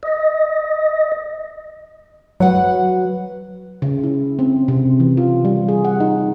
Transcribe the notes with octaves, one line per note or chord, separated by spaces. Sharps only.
D#5
F#3 F#4 B4 F#5
C#3
E4
C4
C3
E3
F4
G3
G#4
F#5
D#4